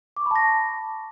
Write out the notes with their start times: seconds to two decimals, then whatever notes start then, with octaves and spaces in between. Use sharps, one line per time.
0.17 D6
0.21 C#6
0.26 B5
0.31 A5
0.36 A#6